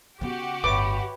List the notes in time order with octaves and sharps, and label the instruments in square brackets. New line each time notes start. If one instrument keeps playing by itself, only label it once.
[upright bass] C#3 B3 [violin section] F#4 G4
[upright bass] G1 A2 [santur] B4 C#5 E5 [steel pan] D6